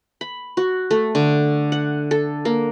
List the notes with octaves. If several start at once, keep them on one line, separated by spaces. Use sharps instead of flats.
B5
F#4
A3
D3
F#5
A4
A#3